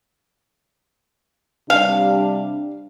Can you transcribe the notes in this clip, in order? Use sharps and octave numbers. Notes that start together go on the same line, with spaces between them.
C3 G3 D4 F5